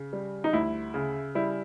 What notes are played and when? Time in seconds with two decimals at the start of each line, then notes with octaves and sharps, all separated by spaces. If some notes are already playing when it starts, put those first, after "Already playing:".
Already playing: C#3
0.13 G3
0.44 D#4
0.53 D2 E4
0.94 C#3
1.35 G3 E4